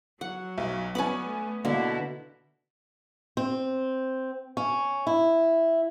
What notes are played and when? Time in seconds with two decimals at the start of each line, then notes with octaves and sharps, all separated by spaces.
0.21 F#3 F#5
0.58 B1
0.95 B3 C#4 D5 G#5 B5
1.26 A3
1.65 B2 D3 A#3 E4
3.37 C4
4.57 C#4
5.07 E4